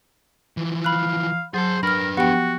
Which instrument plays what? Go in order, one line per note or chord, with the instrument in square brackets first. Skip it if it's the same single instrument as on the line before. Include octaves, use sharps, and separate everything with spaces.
[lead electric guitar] E3 F3
[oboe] F5 [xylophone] B5 F#6
[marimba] F#3 [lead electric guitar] G#4 A5 [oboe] C5
[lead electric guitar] D4 B4 [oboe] A#4 [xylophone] B5 F6
[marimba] F3 B3 G4 [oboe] F#4 [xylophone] F#5 G5